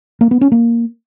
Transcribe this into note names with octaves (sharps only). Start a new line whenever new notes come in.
A#3
B3
C#4
A#3